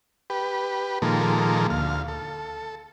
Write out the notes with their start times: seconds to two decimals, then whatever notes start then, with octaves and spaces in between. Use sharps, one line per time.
0.30 G4 B4
1.02 A#2 D#3 F3 G#3 A#3 A4
1.70 D2 F5
2.08 A4